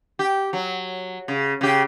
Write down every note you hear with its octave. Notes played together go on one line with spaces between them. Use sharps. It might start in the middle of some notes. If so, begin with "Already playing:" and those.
G4
F#3
C#3
C#3 G4